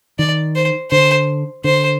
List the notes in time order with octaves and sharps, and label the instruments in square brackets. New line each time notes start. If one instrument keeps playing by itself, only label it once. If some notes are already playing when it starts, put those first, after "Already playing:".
[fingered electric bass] D#3 [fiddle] D5
[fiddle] C5
[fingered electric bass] D3 [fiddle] C5
[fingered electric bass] D3 [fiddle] C5